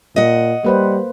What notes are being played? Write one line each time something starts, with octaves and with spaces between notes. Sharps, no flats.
A#2 D#5 F#5
G3 A#3 B4 C5